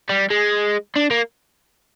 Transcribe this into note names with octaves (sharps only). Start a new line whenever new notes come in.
G3
G#3
D4
A#3